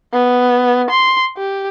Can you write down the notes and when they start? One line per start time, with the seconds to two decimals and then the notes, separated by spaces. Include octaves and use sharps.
0.13 B3
0.90 C6
1.38 G4